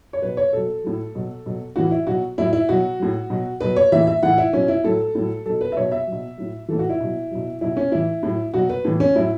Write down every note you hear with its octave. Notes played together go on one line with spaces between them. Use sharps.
C#5
B2 F#3 B4
C#5
B2 F#3 A4
A2 F#3
B2 F#3
B2 F#3
A2 E3 F#4
E4
B2 F#3 F#4
A2 F#3 E4
E4
B2 F#3 F#4
A2 F#3
B2 F#3
B2 F#3 B4
C#5
A2 E3 E5
E5
A2 E3 F#5
E4
B2 F#3 C#4
E4
A2 F#3 A4
A2 F#3
B2 F#3 A4
B4
E5
B2 F#3 C#5
E5
F#3
B2
A2 F#3
A2 E3 A4
F#4
E4
B2 F#3
B2 F#3
B2 F#3 E4
C#4
A2 E3 E4
A2 F#3
B2 F#3 F#4
B4
A2 E3
C#4
A2 F#3 E4